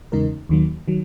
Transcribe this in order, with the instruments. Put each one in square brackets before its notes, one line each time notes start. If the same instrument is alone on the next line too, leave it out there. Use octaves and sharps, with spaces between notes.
[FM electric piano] E2 C#3 G#3 D#4 A#4
D#2 D#3 F#3 A#3
D#3 F#3